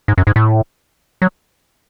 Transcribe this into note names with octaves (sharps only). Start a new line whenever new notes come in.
G#2
F#2
G#2
A2
F#3